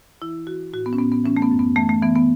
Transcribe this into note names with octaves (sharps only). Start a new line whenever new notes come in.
E3 E4
E3 F#4
A2 F#4
B3
C#4
A2 B3
B3
E3 C#4
A3
B3
F#2
B3
E3 A3
A3
E3 B3
B3